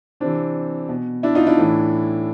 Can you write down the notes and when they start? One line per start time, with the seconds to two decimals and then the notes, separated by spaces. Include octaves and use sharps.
0.20 C3 E3 C4 D4
0.89 B2
1.23 D4 E4
1.35 D#4 F4
1.47 D4 E4
1.58 A2 E3